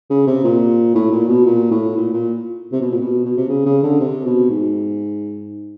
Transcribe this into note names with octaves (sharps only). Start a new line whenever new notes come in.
C#3
C3
A#2
A2
A#2
B2
A#2
A2
A#2
A#2
C3
B2
A#2
B2
B2
C3
C#3
C#3
D3
C3
B2
G#2